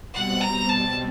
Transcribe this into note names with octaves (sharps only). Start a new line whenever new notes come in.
B2 G3 C4 F#5
A#5
A5